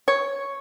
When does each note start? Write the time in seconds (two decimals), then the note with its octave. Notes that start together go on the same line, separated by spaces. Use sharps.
0.08 C#5